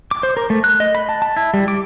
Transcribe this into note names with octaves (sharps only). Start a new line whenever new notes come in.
D6
C5
A#4
A3
F#6
D#5
B5
A5
A5
E4
G3
D6